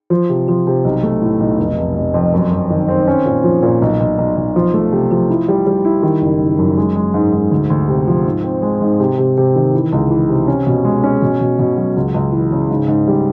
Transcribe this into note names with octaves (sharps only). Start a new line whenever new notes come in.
F3
C3
F3
C3
B1
A3
A2
B1
F1
F1
F1
F2
F#2
F#2
D#3
C4
C#4
A#2
F3
A#2
B1
B1
B1
B1
F3
A3
C3
F3
E4
G3
G3
E4
D#3
F#1
F#1
F#2
G#3
G#3
G#2
G#2
D2
D2
C3
F3
G#2
C4
G#3
G#2
C3
C3
C3
D#3
E3
C#2
E3
C3
C#4
B2
G#3
C#4
B2
B2
B2
F#3
C#2
C#2
E3
C#3
G#2
G#2
G3